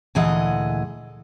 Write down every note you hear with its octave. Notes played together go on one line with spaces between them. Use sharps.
D2 A#2 E3 G#4 D#5 F#5